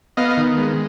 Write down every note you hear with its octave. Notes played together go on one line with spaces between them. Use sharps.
B3 D#5 F5
D#3
G#3